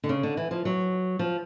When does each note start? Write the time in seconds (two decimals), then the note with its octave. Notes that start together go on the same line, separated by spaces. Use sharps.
0.04 D3
0.09 C#3
0.23 D3
0.37 E3
0.51 F3
0.65 F#3
1.19 F3